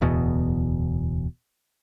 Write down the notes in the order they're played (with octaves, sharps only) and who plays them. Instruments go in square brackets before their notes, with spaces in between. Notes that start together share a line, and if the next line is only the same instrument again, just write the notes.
[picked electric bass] D1 E2 B2